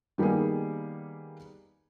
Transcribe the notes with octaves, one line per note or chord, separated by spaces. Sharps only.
D#3 G3 A#3 B3 G#4